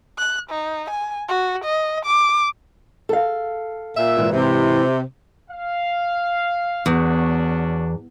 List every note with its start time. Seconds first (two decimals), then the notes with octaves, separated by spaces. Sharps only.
0.18 F#6
0.50 D#4
0.90 G#5
1.29 F#4
1.64 D#5
2.05 D6
3.09 A4 F5
3.97 A#2 E5
4.17 G#2 E3
4.33 C3
5.49 F5
6.86 E2 C#4 D4 F#4